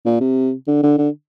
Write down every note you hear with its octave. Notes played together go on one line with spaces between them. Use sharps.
A#2
C3
D3
D3
D3